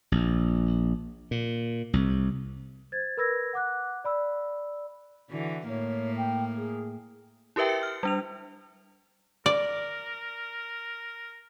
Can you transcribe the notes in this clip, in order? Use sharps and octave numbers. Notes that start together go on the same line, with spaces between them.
A#1
A#2
C2
C5 G#6 A6
A#4 B4 B5 E6 G#6 A#6
F#5 D6 F#6
D5 B5 E6
D3 E3 F#4
A2 A#3 C#5
G5
G#4
E4 G4 A#4 B4 E5 G5
C#7
F6
G3 D4 F7
A#4 D5